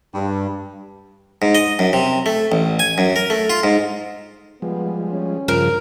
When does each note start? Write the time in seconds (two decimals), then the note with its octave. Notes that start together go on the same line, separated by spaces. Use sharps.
0.14 G2
1.42 G#2
1.55 D#5
1.79 F#2
1.93 C3
2.26 A3
2.52 A1
2.79 G#5
2.98 F#2
3.16 A#4
3.30 A3
3.50 F4
3.63 G#2
4.62 F3 G3 G#3 B3
5.12 C#4
5.48 G2 C#3 F3 A#4